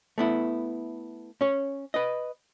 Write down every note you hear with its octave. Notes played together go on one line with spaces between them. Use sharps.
A3 B3 E4
C#4 C#5
B4 D#5